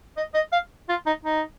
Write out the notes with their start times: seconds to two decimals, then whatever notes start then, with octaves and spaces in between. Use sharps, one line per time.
0.17 D#5
0.34 D#5
0.52 F5
0.89 F4
1.06 D#4
1.25 D#4